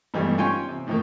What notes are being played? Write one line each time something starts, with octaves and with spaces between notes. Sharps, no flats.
G#1 G2 B2 E3 G3 A3
C#4 F4 G5 G#5 C6 C#6
C3
A2 D#3 F3 A3 A#3